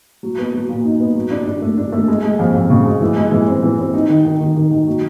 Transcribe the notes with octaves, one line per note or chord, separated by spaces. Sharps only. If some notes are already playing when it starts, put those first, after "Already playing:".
F#3
B3
F#3
A#2
D#4
B3
F#3
D4
D4
A3
D4
A3
G#3
G#3
F2
F2
C#3
G#3
E3
G#3
E3
C4
E3
C4
D#4
D#3
D#3
D#3
D#3
D#3
F#3